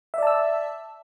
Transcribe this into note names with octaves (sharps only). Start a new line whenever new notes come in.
D5 E5 A5 E6